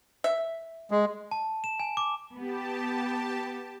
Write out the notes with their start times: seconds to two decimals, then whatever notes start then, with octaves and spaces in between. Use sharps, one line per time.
0.24 E5
0.91 G#3
1.31 A5
1.64 E7
1.80 G#5
1.97 D6
2.37 B3 G4 A5